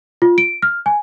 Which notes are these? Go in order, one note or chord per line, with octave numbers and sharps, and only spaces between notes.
F4
D7
F6
G#5